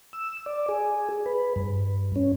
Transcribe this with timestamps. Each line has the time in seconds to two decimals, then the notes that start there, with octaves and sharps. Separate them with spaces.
0.13 E6
0.46 D5
0.69 G#4
1.26 B4
1.56 G2
2.16 C#4